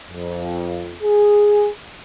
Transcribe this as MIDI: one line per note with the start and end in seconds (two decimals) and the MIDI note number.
0.11 0.95 41
1.03 1.69 68